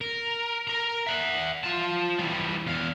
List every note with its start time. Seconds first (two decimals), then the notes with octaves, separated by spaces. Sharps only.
0.01 A#4
0.67 A#4 A#5
1.07 E5 F#5
1.63 F4 A5
2.18 E3 G3
2.66 E2 F5